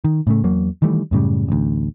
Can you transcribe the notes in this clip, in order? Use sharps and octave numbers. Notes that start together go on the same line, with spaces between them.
D#3
A2 C#3 A3
E2 F#3 A#3
D#3 E3 G3 A3
F#2 A2 C#3 G3
A1 D2